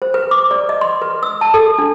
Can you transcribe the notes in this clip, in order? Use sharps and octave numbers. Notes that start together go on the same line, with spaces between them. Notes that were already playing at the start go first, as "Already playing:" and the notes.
C5
B4
D6
D5
D#5
C6
B4
E6
A5
A4
D4